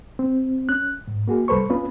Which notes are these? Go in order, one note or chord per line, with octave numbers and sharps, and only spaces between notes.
C4
C#4 F#6
G#2
A#3 F#4 G#4
C2 G3 A4 B4 C5 C#6
B3 C#4 F4 B4